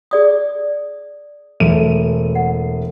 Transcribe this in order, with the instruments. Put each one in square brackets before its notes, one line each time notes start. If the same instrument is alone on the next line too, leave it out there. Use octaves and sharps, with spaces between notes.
[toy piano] G#4 D5 D#6
[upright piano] E1 A3 D#7
[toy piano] F#5